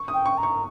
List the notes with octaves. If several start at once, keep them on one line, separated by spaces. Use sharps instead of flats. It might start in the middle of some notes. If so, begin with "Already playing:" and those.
Already playing: C#6
D#6
G5
C#6
A#5
C#6